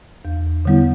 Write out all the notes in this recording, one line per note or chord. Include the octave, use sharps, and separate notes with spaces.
E2
D3 G3 B3 E4